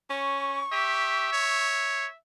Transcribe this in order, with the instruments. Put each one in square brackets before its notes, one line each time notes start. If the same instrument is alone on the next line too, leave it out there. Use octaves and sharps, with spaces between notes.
[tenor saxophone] C#4 [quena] C#6
[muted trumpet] G4 [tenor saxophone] E5
[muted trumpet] C#5